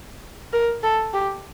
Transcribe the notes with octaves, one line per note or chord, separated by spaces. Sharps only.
A#4
A4
G4